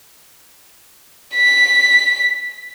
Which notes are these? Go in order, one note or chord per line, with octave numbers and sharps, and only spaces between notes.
B6